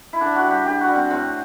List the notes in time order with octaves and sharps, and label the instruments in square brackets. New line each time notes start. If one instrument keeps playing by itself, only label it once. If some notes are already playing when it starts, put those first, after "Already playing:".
[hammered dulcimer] E4
D3 D4
F#4
G3
G4
D3 G4
F#4
G3
C4
A2 C4